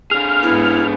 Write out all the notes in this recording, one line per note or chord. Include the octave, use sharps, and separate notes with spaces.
D3 G#4 F6
G#2 B3 E4